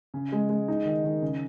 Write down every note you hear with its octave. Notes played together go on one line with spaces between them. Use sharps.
C#3
G#3
G#3
D#4
D#3
D#3
C#3